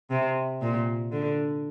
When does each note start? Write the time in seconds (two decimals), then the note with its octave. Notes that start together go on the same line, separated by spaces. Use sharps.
0.10 C3
0.62 A#2
1.12 D3